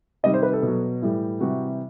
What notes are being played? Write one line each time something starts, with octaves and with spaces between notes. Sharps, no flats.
C3 D#3 G3 D#5
C5
B4
A4
B2
F#3
A2 E3 G3
C3 E3 G3 F#4